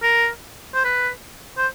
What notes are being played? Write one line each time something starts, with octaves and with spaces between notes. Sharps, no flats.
A#4
C5
B4
C5